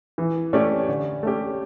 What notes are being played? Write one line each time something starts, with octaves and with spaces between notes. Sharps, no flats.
E3
A3 C#4 G4 D5
D3
A3 C#4 G4